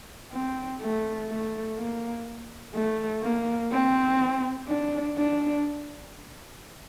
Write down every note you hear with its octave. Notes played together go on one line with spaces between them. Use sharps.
C4
A3
A3
A#3
A3
A#3
C4
D4
D4